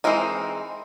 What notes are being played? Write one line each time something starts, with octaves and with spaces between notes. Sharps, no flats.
E3 G#3 C4 D#4 A#4